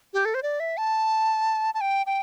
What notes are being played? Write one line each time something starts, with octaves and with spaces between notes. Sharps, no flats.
G4
A4
C5
D5
E5
A5
A5
G5
G5